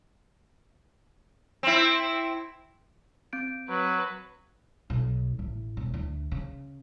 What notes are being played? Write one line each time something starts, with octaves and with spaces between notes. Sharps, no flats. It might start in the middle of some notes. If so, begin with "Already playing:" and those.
C4 E4
C4 G6 D7
F#3 B4
B1
A1
E1
D2
C#3